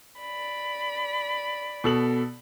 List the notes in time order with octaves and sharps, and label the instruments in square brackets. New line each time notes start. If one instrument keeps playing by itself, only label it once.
[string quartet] D5 B5
[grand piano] B2 A4 F#7